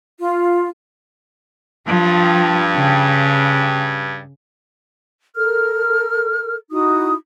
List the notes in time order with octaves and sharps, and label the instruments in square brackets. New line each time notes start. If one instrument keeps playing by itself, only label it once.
[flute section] F4
[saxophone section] G2 [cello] F3
[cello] C#3
[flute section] A4 A#4 F6
D#4 E4 F#4 D#6